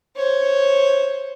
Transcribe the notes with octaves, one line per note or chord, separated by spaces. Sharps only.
C5 C#5